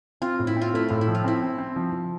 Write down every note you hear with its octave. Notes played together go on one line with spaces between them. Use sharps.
C4 F4
A2
E4
C4 F4
A3 E4
A2 F4
E4
F3
F4
C4 E4
C4
C4
F3
F3